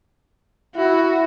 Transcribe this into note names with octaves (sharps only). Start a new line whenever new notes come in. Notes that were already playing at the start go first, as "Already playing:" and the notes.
E4 F#4